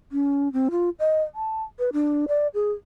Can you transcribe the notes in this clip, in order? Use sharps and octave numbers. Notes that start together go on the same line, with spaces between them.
C#4
C4
F4
D#5
A5
B4
D4
D5
G#4